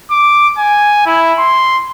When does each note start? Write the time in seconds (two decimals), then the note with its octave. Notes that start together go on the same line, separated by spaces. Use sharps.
0.11 D6
0.58 G#5
1.06 E4
1.39 C6